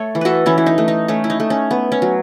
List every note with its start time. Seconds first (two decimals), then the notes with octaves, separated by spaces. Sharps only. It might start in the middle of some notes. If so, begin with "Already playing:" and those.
Already playing: A3 A4 C#5
0.15 E3
0.21 F#4 A4 B4
0.46 E3 C#4 E4
0.58 E4
0.66 D#4
0.78 A3
0.88 D#4
1.08 A3 C#4
1.24 E4
1.30 D#4
1.40 A3
1.50 C#4
1.71 B3
1.92 C#4
2.02 F#3